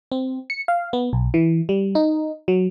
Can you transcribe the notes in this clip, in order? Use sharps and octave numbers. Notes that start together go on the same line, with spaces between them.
C4
C#7
F5
B3
B1
E3
G3
D#4
F#3